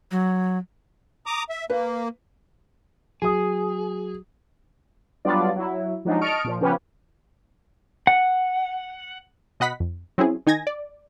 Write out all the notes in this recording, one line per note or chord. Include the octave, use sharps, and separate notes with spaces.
F#3
A#5 D6 D#6
E5
A#3 B4
F#3 G#4 D#6
F#3 G3 B3 D4 F4 D5
F#3 E4
F3 F#3 G#3 D4 D#4
D#5 A5 C#6 F6 D7
A#2 F3
C#3 F3 B3 C#4 G4 B4
F#5
B2 D#5 F#5 B5 B6
F2
F#3 C4 C#4 E4 G#4
D#3 D#4 G#5 G#6 A#6
D5